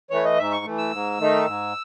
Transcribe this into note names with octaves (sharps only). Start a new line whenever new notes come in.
E3 A3 C#5
D#5
G#2 E5
C#6
E3 A3
E6
G#2
D#3 A3 D#4
G#2